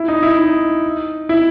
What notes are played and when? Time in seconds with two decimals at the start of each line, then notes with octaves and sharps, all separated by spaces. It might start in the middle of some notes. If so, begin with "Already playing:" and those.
Already playing: E4
0.08 D#4
0.23 E4
0.39 D#4
1.29 E4